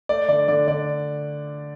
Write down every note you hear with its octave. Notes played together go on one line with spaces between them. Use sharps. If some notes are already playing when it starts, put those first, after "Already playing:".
A3 D5
D3 D5
D3 D5
D3 D5